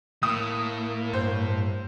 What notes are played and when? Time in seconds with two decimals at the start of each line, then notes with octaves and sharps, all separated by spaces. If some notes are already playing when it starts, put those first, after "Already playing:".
0.23 A2 A#3 D#6
1.13 G2 C5 G6